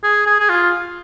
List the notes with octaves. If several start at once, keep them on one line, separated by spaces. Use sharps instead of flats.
G#4
G#4
G#4
F4